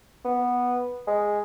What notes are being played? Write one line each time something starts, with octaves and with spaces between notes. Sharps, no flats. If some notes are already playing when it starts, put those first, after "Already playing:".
B3
G#3